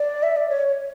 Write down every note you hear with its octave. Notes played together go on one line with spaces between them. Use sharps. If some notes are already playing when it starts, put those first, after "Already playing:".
Already playing: D5
E5
D5
C#5
C#5